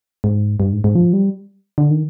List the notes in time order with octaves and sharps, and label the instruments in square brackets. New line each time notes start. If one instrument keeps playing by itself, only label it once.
[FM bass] G#2
G2
G#2
G#2
F3
G3
D3
D#3